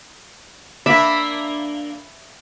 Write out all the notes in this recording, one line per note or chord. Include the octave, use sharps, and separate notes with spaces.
A#3 D4 D5 E5 B5